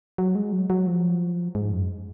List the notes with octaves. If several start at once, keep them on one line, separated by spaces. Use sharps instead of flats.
F#3
G#3
F#3
F#3
F3
G#2
F#2